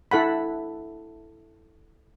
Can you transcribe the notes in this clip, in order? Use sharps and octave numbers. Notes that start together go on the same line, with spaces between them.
E4 A4 F#5 B5